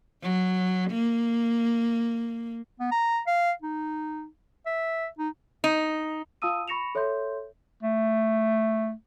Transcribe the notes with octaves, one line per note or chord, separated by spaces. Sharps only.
F#3
A#3
B3
A#5
F5
D#4
E5
D#4
D#4
F4 F5 A5 D#6 E6 D#7
B5 C#6 A#6 C#7 E7 F7
A4 C#5 E5 C6 G6
A3